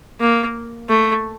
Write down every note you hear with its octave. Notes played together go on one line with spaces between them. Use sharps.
A#3
A3